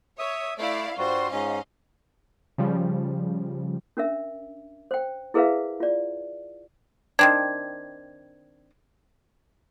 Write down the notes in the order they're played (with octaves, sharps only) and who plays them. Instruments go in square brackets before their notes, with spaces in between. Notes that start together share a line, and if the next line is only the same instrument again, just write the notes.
[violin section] C#5 [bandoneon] E5 D#6
[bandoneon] A3 [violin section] E4 D5 F5
[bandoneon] G2 G3 F#4 [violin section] F4 C5 C6
[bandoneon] G#2 C#4 [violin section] D#5 F5
[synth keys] C#3 F3 G3
[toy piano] C#4 D4 A#4 E5
C5 G5
E4 G#4 A#4 B4 E5 F5
F4 D5
[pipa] D#3 C4 D4 [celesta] G#6